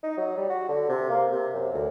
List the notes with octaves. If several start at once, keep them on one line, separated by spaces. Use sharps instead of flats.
D#4
F#3
G3
F#4
D3
C3
A#3
C3
F#2
D2